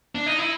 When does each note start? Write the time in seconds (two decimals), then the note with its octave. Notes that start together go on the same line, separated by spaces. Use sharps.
0.15 D4
0.26 D#4
0.39 E4